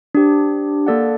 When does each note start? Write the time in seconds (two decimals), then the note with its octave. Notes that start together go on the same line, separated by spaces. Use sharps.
0.15 D4 G4 C5
0.86 A#3 D4 A4 D5 F#5